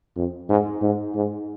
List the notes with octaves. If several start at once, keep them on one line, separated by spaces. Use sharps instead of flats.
F2
G#2
G#2
G#2